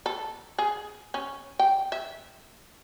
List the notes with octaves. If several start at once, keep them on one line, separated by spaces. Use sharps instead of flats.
A4
G#4
C#4
G5
E5